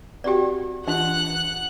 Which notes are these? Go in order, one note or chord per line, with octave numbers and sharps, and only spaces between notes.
C4 F#4 G4 D5 G5
E3 D4 F4 F#5 F#6